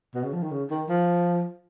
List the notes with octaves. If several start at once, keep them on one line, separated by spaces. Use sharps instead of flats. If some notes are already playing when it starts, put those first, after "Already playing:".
B2
C#3
F3
D#3
C#3
D#3
F3